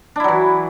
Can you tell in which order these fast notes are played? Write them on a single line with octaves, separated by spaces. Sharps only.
D4 E4 F#3 E3